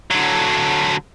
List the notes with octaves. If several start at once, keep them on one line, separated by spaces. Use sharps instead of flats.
D3 F#3